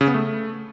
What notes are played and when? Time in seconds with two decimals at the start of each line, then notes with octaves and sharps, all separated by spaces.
0.01 C#3
0.07 B3
0.14 A3